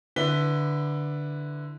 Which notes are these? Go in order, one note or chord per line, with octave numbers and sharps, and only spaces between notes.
D3 E4 B4 B6 G7